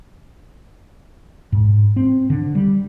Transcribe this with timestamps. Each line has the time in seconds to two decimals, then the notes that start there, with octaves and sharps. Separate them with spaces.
1.52 G#2
1.96 C4
2.30 D3
2.55 G3